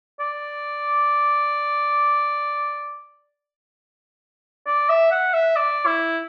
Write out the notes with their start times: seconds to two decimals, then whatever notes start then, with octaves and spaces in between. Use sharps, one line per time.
0.20 D5
4.67 D5
4.90 E5
5.12 F#5
5.34 E5
5.56 D5
5.86 E4